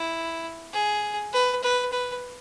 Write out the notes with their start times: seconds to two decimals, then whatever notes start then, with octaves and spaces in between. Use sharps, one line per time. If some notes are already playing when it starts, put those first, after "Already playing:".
Already playing: E4
0.73 G#4
1.33 B4
1.63 B4
1.92 B4